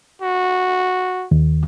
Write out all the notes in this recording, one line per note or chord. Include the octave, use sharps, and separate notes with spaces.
F#4
D#2